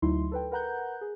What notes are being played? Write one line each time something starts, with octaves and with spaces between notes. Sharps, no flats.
D2 F#3 D#4 E4 C6
A4 B4 G5
A#4 B4 F#5 A#5 F#6 G6
G#4